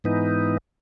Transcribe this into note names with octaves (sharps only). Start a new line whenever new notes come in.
G#2 E3 B3 D#4